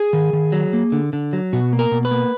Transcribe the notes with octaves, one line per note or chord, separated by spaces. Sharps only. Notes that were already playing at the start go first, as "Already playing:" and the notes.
Already playing: G#4
D#3
D#3
F#3
A#3
D3
D3
F#3
B2 F#4
A#3
A#4
B2
B4
A#3